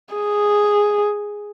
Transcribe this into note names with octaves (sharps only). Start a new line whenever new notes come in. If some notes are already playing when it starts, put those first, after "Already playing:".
G#4